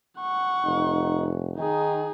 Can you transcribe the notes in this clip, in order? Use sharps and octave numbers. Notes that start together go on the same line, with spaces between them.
F#5 C#6
F1 D#4
D#3 D#4 G#4